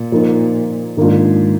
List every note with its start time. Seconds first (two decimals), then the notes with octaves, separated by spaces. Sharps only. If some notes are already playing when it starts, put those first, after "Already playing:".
Already playing: A#2
0.12 F3 A#3 D#4
0.97 G#2 D#3 A#3 D4 F4